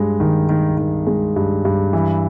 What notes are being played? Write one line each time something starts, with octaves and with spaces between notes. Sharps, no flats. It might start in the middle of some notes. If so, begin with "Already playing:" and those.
Already playing: G2 G#3
D#3
D#3
D#3
G#3
G2
G2
E3